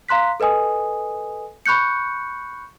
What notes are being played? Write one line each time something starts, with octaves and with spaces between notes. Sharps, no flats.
F5 A#5 C6 F#6 B6
A4 B4 D#5 G#5 D#6
B5 C#6 F#6 G6 C#7